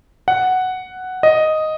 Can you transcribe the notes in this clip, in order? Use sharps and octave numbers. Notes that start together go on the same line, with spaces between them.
F#5
D#5